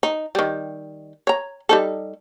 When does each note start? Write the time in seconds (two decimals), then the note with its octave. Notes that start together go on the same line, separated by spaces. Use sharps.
0.03 D#4
0.35 D#3 G3
1.27 C#5 A#5
1.69 G3 D#4 A4